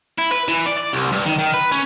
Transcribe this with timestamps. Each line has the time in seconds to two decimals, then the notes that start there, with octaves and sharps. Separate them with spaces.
0.19 E4
0.32 B4
0.48 E3
0.66 D5
0.78 D5
0.93 C2
1.12 G2
1.26 D#3
1.39 D#3
1.54 B4
1.72 C#4